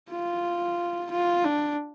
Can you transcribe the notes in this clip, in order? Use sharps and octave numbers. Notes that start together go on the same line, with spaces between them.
F4
F4
D4